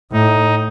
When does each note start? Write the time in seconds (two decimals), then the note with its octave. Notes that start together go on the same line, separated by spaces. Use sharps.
0.12 A2 D#4